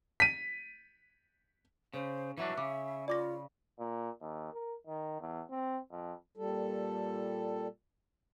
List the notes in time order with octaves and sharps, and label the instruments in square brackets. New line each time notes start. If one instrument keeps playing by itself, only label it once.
[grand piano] B6 D#7
[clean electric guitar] C#3 [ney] C5
[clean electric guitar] E3 F#3 D4 [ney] E5
[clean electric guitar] C#3 [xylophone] D6
[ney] F4 [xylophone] D5 D6 A#6
[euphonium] A#2
D#2
A#4
D#3
E2
C4
F2
[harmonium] A#2 G3 A4